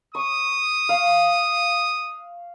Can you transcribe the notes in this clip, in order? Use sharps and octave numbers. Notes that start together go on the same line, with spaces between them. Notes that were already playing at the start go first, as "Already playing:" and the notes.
C#6 D#6
F5